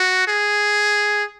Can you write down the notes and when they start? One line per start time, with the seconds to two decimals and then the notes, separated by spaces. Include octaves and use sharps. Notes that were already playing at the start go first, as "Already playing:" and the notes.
Already playing: F#4
0.28 G#4